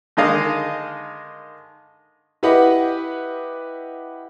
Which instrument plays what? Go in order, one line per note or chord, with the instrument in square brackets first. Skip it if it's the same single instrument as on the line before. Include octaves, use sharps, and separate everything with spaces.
[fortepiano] D3 D#3 G#3 D#5 F5
[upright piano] E4 G4 B4 D#5 F#5